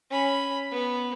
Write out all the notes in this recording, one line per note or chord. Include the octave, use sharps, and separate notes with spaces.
C#4 B5
B3